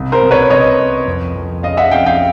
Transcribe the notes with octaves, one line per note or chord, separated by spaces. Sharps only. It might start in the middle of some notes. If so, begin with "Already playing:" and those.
Already playing: C2
A#4 C5
C2
B4 C#5
C2 C#5 D#5
C2
F2
F2
C#3 D#5 F5
E5 F#5
F2 F5 G5
F5 G5